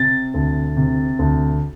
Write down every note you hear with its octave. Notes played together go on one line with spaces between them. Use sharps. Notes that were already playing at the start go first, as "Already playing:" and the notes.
Already playing: C3 A6
D2
C3
D2